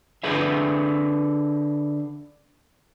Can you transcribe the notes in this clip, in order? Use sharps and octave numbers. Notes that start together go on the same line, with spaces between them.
D3 G#4 B4 E5